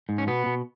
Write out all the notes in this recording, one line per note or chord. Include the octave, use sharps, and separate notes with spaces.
G#2
C#4
B2 B3
B2